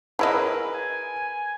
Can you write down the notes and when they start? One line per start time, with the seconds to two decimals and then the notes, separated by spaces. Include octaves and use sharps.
0.19 E4 G#4 A#4 B4 C#5 D#5
0.75 G#5